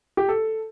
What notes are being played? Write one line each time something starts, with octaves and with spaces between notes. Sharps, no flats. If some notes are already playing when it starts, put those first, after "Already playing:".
G4
A4